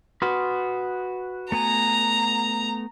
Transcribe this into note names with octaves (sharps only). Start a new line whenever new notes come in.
F#4 B4 C6 D#6 F6
A3 B3 G#5 A#5